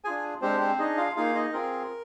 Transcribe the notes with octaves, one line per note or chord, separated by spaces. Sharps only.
D4 F4 G#4 G#5
G#3 C4 D4 G4 C5
C4 C5
D4 D#4 G#4 D#5
F4 F5
A#3 D#4 F4 G#4 F5
D#4 D#5
C4 F4 G#4 A#4